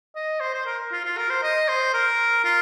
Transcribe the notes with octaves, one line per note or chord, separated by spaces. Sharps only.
D#5
C5
C5
A#4
F4
F4
A#4
C5
D#5
C5
A#4
F4